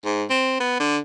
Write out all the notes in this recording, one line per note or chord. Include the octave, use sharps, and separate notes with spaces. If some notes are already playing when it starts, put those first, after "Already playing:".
G#2
C4
B3
D3